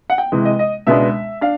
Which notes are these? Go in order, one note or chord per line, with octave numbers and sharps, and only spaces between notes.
F#5
G5
C3 E3 G#3
D#5
D#5
C#2 B2 G#3 B3 D4 E5
D4 F5